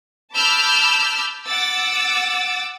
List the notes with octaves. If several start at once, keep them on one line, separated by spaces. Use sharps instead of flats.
A5 B5 D6 E6 F6 G6
F#5 D6 E6 A6